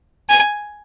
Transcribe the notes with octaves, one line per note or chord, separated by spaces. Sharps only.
G#5